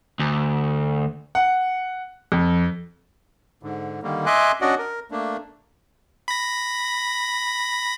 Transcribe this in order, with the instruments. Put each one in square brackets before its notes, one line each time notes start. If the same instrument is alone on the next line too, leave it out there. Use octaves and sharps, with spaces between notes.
[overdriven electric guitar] D2
[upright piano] F#5
F2
[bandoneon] G#2 D3
D3 D#3 G3 A#3
D#5 E5 G#5 C6 D6 F#6
C#4 D4 F#4 D5 D#5 F#5
A#4
A3 A#3 D4
[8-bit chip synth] B5 A#6